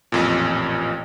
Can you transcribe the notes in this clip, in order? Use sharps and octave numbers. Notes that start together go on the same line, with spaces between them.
A1 F2 A#2